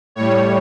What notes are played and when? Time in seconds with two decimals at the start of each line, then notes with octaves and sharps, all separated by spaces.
0.16 A2 G3 C#5